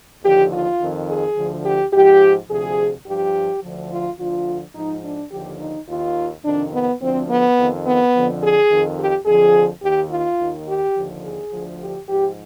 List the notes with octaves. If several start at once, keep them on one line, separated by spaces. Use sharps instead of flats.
D#2 D3 F3 G4
F4
F2 D#3
G#4
D2 D3 F3
G4
G#2 F3 G4
D2 C3 F3 G#4
G2 F3 G4
D2 D3 F3
F4
D2 D3 F3 F4
G#2 F3 D#4
D4
D#2 D3 F3 G4
D#4
D#2 D#3 F4
F2 C3 D#3 D4
B3
D2 D3 F3 C4
B3
F2 D#3
B3
F2 D3 F3
G#4
F2 D#3
G4
F2 D3 F3 G#4
D#2 D#3 G4
F4
D#2 D#3
G4
D#2 D3 F3
G#4
D2 D3 F3
G4
G#2 F3 G4